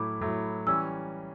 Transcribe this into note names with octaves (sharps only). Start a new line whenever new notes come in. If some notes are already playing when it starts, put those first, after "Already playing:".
Already playing: A2 F#3 A3 E4 D6
A2 F#3 A3 E4
E3 G3 C#4 E6